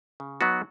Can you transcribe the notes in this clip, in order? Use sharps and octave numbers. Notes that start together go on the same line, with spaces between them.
C#3
F#3 B3 D#4 F#4